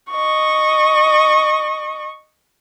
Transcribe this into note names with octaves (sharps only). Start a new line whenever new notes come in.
D#5 C#6